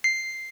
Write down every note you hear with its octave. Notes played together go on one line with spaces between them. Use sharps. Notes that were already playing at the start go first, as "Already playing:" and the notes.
C7